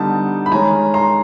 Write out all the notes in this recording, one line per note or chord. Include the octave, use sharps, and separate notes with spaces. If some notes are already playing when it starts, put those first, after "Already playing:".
Already playing: D3 G3 B3 D#4 A5
B5
D#3 G#3 C#4 G#5 A#5
A#5 C6